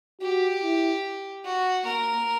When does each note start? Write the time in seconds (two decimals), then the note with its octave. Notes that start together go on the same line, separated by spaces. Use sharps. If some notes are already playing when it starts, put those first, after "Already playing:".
0.21 F#4 G4
0.63 E4
1.44 F#4
1.85 A#3 A#4